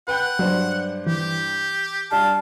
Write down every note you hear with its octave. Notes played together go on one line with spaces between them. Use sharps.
B4 F#5 G5 G6
G2 F#3 D4 C5
E3 G4
G3 D4 F5 A5